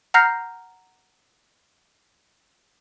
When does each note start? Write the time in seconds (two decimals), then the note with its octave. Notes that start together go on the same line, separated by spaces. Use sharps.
0.14 F#5 A#5 F6 G6 A#6 C7